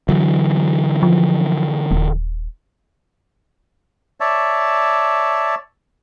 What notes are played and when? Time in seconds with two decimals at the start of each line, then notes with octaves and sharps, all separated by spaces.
0.09 D3 E3 F#3
1.03 F3
1.91 D#1
4.20 C#5 D5 E5 A5